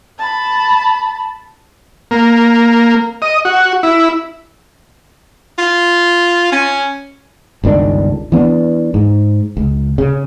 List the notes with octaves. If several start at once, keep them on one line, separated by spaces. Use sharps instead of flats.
A5 B5
A#3
D#5
F#4
E4
F4
C#4
G1 C#2 D#3 D4
E3 B3 D4
G#2
C#2
C#3